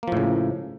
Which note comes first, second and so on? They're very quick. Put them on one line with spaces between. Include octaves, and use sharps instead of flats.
A#3 F3 A2 C#3